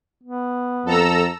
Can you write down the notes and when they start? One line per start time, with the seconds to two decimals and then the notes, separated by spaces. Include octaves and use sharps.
0.23 B3
0.86 F2 A4 A#5 E6